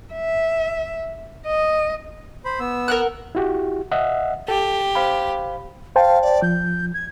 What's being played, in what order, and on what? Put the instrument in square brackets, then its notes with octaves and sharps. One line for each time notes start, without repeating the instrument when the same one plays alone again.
[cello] E5
D#5
[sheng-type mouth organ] C5 B5
B3 E6
[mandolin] A#4 F#5 F#6
[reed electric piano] E4 F#4 G4
D#5 E5 F#5
[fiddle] G4 [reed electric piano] A4
[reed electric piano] C5 F5 B5
[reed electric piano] C5 G5 A5 [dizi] F5
[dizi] D5
[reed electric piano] F3 [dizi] G6
[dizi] G#6